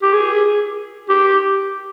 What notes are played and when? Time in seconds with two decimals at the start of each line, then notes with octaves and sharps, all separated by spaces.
0.02 G4
0.13 G#4
1.09 G4